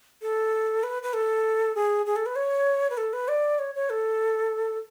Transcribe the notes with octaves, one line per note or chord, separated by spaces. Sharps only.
A4
B4
B4
A4
G#4
G#4
A4
B4
C#5
B4
A4
B4
D5
C#5
C#5
A4